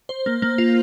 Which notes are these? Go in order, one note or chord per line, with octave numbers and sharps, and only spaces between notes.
C5
A#3
A#3
F4